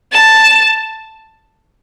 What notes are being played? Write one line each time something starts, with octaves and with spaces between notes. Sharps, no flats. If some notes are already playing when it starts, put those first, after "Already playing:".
A5